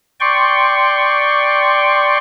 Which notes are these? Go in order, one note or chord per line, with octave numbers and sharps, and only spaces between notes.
D5 G5 C6 C#6